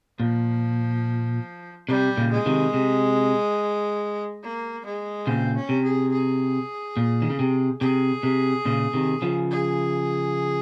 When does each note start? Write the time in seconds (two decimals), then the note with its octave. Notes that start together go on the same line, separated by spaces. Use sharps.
0.20 A#2 F3
1.89 C3 G3
2.17 A#2 C#3
2.31 G#3
2.46 C3 D#3
2.74 C3
4.43 A#3
4.85 G#3
5.27 A#2 C#3 C4
5.56 C#4
5.69 C3
5.84 G#4
6.12 G#4
6.97 A#2
7.22 D#3
7.30 C#3
7.39 C3
7.80 C3 G#4
8.23 C3
8.65 A#2 C#3
8.94 C3 D#3
9.22 C#3 F3
9.51 G#4